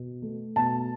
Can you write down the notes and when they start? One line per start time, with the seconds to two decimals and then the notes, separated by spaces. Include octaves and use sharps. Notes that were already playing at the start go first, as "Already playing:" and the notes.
Already playing: B2
0.22 A3
0.56 B2 A5